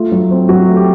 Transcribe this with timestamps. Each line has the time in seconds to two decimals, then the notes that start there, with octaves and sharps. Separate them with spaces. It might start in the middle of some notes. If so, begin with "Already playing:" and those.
Already playing: A3 F4
0.12 F#3
0.31 C4
0.49 F#3 F#4
0.68 A3
0.76 G4